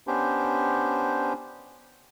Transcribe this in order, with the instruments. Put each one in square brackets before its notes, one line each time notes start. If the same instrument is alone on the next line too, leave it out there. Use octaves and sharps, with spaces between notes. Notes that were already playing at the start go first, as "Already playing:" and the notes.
[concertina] B3 C#4 D4 G4 C5